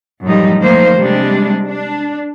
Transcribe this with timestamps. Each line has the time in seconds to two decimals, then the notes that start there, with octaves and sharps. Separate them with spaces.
0.23 F#2 A2 F3 G3 D#4
0.62 D#3 F3 A3 A#3 C5
0.98 C3 G3 G#3 D4
1.69 D4